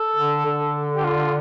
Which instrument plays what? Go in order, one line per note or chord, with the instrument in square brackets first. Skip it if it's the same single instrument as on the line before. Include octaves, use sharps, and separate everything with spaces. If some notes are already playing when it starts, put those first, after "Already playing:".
Already playing: [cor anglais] A4
[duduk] D3
D3
[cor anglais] G4
F4